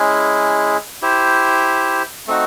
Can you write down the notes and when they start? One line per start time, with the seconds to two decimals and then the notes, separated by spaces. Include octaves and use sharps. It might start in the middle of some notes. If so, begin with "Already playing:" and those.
Already playing: G#3 C#4 E4 G#4
1.02 E4 G4 C5
2.27 A3 C4 D#4 F#4